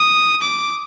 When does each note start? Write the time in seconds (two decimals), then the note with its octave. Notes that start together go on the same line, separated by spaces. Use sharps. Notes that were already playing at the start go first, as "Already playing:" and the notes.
Already playing: D#6
0.42 D6